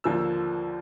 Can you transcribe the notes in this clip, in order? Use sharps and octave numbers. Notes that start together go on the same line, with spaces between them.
D#2 D3 F3 A#3 E6